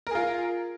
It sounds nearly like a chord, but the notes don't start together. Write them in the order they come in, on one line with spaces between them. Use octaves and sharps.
A#4 G#4 F4